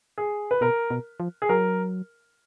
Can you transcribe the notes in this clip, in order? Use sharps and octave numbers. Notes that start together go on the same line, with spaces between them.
G#4
B4
B2 A#4
B2
F3
G#4
F#3 A#4